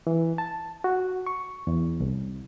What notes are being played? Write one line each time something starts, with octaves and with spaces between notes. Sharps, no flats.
E3
A5
F#4
C#6
E2
C2